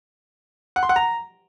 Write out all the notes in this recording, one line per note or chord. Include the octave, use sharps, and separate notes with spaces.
F#5
C6
F#5
A#5